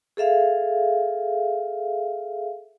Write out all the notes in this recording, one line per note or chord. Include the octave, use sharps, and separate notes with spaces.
G#4 A4 E5 F5